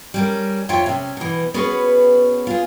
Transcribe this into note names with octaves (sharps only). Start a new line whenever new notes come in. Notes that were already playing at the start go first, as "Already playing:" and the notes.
G3 C#4 A#4
F2 F4 C#5 E5 G5
C3 C#4
B2 E3
B3 C#4 F#4 G#4 B4
F4 G#4